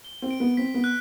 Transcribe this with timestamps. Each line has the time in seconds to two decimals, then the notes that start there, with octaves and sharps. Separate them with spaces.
0.05 G7
0.22 C4
0.31 D7
0.40 B3
0.57 C4 B6
0.74 B3
0.84 F#6